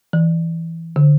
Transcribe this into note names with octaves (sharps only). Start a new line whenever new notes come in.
E3
D3